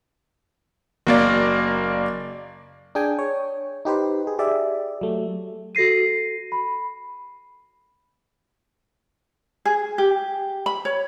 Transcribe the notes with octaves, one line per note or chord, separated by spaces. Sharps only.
F#1 A#3 D5
D4 G#4 G5 G#5
C#5
D#4 G4 B4 C5
G#4
G4 G#4 D5 E5
F#3 A3
F#4 A4 A#6 C7 D#7
B5
G#4
G4
B5
C#5